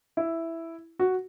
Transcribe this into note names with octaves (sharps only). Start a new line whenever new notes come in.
E4
F#4